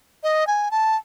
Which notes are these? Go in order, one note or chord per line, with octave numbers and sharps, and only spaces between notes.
D#5
G#5
A5